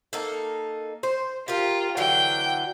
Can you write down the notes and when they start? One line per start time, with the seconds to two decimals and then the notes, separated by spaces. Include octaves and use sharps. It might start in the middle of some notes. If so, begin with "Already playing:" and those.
0.13 A#3 D#4 A4
1.03 C5
1.48 F4 G4 A#4
1.97 D3 E3 F#3 G5